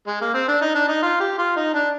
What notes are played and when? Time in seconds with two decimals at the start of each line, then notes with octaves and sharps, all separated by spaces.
0.07 G#3
0.21 A#3
0.34 C4
0.48 D4
0.62 D#4
0.75 D4
0.88 D#4
1.02 F4
1.20 G4
1.39 F4
1.56 D#4
1.74 D4